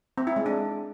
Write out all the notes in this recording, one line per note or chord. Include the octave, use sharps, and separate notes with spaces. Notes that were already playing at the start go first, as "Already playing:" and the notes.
C4
E4
G#3
D4